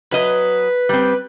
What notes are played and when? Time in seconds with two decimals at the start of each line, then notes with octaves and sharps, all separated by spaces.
0.12 F#3 B4 D#5
0.89 G3 C4